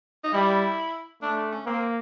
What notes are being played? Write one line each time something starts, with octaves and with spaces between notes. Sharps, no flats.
D#4
G3 E4
A3 D4
D4
C#4
A#3 C4